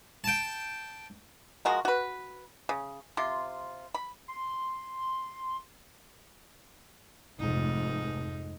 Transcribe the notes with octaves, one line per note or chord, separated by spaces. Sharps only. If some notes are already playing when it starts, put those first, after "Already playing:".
G5 A5
F3 G#3 F#4 A#4
F#4 B4
C#3
C3 F4 C6
B5
C6
F1 G#2 D#4